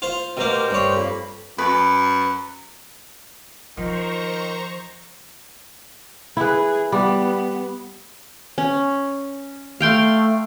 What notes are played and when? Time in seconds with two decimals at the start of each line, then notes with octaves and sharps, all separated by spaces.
0.02 F4 C5
0.37 B2 A#3 G4 A#4 C5
0.70 G2 C#5
0.96 F2 A#3 B5
1.58 F#2 B4
3.77 D#3 F3 C5 A#5 C#6
6.37 E4 G#4 B4
6.92 G3 B3
8.58 C#4
9.80 A3 F5 G5 C6